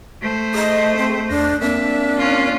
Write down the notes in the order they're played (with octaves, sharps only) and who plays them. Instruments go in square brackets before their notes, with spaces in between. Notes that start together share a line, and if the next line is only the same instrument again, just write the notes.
[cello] A3 C5
[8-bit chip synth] G#4 [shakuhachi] D#5
[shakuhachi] C4
[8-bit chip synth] E2 A#6 [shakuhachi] D4
[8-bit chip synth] A#3 C4 A#4 [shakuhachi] D4 [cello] E5
[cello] C#4 F4